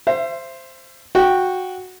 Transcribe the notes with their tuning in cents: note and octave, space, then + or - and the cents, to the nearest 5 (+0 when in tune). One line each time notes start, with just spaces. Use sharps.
C5 +0 E5 +35
F#4 -10 G5 +0